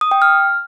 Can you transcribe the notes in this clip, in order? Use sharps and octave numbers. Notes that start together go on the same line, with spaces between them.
D#6
G5
F6